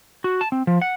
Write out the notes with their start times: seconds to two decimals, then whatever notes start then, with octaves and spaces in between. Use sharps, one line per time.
0.24 F#4
0.41 A5
0.52 C4
0.67 F3
0.82 F#5